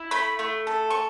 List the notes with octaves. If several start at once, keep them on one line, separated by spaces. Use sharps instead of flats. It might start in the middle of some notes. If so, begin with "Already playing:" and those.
Already playing: E4
A3 B5
A3
A4
C#6